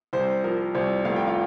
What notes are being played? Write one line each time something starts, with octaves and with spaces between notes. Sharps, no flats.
C2 C5
F3 A#4
C2 C5
F1 F5
G5
F4 F5